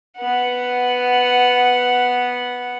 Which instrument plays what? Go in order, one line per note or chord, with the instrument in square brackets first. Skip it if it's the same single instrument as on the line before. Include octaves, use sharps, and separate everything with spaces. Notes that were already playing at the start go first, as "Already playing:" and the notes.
[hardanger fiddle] B3 F#5